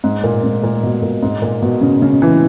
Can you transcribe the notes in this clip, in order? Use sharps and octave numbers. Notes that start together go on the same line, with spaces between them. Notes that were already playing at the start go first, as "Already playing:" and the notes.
G#2
A#2
G#2
A#2
B2
A#2
G#2
A#2
B2
C#3
C#3
E3